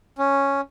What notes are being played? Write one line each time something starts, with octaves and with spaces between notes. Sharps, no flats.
C#4